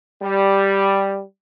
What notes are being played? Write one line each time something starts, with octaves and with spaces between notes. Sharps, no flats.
G3